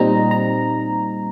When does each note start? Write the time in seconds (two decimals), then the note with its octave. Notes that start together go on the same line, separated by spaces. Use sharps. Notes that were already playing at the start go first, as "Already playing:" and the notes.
Already playing: A#2 G3 C4 D#4 A#5
0.31 A#5